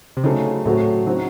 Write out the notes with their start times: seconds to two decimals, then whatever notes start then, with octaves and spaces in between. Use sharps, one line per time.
0.17 C3
0.24 C#3 F#3 A3 C4 D#4
0.65 A2 F#3 A3 C4 F#4
1.06 F#3 C4 D#4 F#4